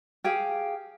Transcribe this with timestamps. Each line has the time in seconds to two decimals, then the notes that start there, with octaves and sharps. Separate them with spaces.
0.24 G4 G#4 F5